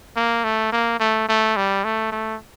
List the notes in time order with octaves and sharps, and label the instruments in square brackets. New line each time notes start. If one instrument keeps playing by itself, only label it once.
[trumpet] A#3
A3
A#3
A3
A3
G3
A3
A3